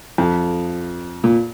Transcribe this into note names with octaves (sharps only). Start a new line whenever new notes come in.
F2
A#2